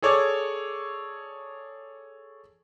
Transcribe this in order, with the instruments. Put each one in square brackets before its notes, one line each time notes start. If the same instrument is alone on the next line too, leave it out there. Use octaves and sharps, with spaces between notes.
[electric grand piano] G#4 A4 C#5 D5 D6 G#6